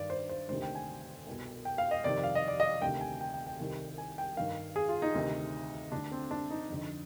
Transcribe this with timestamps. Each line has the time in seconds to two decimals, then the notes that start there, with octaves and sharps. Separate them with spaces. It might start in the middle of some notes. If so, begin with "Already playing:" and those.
Already playing: G2 D#3 D5
0.10 C5
0.29 C5
0.49 D2 C3 D#3 C5
0.62 G5
0.75 G#5
1.27 C2 B2
1.65 G5
1.78 F5
1.91 D#5
2.04 F2 C3 D#3 D5
2.23 F5
2.35 D#5
2.48 D5
2.60 D#5
2.81 D2 C3 D#3 G5
3.01 G#5
3.21 G5
3.34 G5
3.46 G5
3.60 C2 C3 D#3
3.98 G#5
4.18 G5
4.37 G2 D#3 F5
4.76 G#4
4.88 F4
5.02 D#4
5.14 D2 C3 D#3
5.92 D2 D3 D4
6.11 C4
6.31 D4
6.50 D#4
6.69 F2 D3